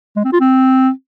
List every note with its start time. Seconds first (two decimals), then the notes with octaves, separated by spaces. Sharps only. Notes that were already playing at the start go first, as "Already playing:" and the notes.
0.16 G#3
0.24 C4
0.32 F4
0.41 C4